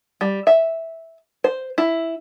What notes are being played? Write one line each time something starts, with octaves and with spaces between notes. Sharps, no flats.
G3
E5
C5
E4